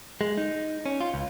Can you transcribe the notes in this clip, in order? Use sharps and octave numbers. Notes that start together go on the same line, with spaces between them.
G#3
D#4
C#4
F4
C#2